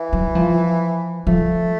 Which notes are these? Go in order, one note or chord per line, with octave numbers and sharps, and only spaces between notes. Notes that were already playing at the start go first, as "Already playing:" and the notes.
Already playing: E3
F#3
F3
F3 A3